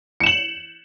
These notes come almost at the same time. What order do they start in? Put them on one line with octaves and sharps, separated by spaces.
C#7 E7 F#7